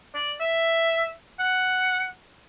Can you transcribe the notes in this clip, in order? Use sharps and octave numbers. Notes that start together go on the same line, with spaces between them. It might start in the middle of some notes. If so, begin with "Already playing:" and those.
D5
E5
F#5